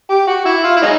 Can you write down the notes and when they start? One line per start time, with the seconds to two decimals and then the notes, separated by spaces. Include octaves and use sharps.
0.10 G4
0.27 F#4
0.45 E4
0.64 F4
0.76 E4
0.82 F#3 G#3 D#4